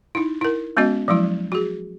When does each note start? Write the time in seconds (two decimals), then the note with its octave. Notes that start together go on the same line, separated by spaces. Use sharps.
0.15 D#4 E4
0.41 E4 A#4
0.77 G#3 B3 C#4 F#4 D#5
1.08 F3 F#3 G#3 E4
1.52 F#4 G#4